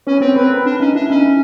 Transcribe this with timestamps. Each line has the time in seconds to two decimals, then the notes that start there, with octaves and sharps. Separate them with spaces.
0.07 C#4 B4 C#5
0.21 C4 C5
0.36 C4 B4
0.51 A#4
0.66 D4
0.80 C#4 D#4
0.95 D4 E4
1.10 C#4 D#4
1.25 E4